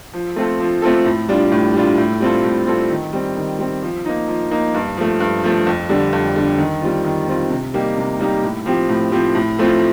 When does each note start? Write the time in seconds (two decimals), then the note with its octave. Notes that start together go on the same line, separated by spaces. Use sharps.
0.13 F3
0.36 A3 C4 F4 A4
0.60 F3
0.82 A3 C4 F4 A4
1.05 A2
1.29 G3 D4 F4
1.52 A2
1.74 G3 D4 F4
1.98 A2
2.20 G3 C4 F4 A4
2.44 A2
2.67 G3 C4 F4 A4
2.90 D#3
3.13 G3 C4
3.36 D#3
3.59 G3 C4
3.83 F3
4.05 A#3 D#4
4.28 F3
4.51 A#3 D#4
4.74 G2
4.97 F3 A3
5.20 G2
5.44 F3 A3
5.67 F2
5.89 D3 G3 D4
6.13 F2
6.36 D3 G3 D4
6.58 D#3
6.82 G3 C4 F4
7.05 D#3
7.28 G3 C4 F4
7.50 C3
7.74 G3 A#3 D#4 G4
7.97 C3
8.19 G3 A#3 D#4 G4
8.43 A2
8.66 F3 C4 G4
8.89 A2
9.12 F3 C4 G4
9.35 A2
9.58 F3 A3 C4 F4